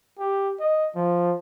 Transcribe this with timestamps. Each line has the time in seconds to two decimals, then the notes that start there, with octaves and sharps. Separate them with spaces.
0.19 G4
0.60 D#5
0.96 F3